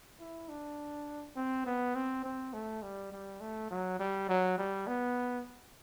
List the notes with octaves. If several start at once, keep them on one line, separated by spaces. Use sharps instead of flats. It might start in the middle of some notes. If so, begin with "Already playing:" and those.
E4
D4
C4
B3
C4
C4
A3
G3
G3
A3
F#3
G3
F#3
G3
B3